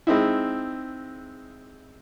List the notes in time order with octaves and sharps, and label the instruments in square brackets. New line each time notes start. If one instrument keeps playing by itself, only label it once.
[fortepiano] G#3 C4 D#4 E4